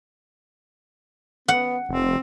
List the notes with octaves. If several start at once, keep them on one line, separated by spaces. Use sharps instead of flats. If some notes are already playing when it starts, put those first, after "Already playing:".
B3 F#5
F1 C4